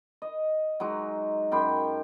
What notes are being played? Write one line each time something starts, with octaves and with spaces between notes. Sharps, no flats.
D#5
F#3 G#3 D#4
F#2 G5 B5 C6